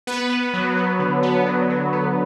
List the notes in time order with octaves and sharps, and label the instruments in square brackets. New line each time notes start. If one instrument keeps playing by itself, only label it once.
[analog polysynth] B3 B4
B3
F#3
B3
D3
B3
F#3
F#3
B3